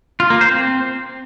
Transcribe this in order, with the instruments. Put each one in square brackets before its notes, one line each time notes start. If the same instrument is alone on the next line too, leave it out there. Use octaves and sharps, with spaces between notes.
[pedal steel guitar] F4
A#3
C5
C4